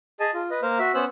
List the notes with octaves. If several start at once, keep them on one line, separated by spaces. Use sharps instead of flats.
G#4 D#5 G#5 A5
F4
B4 D#5
A#3 A#4 C5 F5
F#4 E5
B3 C#4 C5 E6 F#6